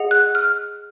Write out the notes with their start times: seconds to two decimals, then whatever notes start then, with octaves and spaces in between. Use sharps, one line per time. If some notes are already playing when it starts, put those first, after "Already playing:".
Already playing: G#4 D#5 F#5
0.11 F#6
0.35 F6